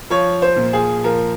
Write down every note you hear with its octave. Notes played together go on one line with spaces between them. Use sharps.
F3 C#5
C5
A#2
G#4
F3 A#4